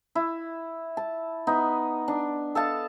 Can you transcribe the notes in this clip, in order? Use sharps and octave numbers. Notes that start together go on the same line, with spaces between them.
E4
A5
B3 D#4
D4
A4 D#5 F5 A5